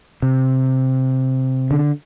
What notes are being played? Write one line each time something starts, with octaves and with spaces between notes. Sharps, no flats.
C3
D3